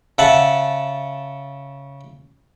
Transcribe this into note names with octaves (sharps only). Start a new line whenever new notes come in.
C#3 E5 F#5 A5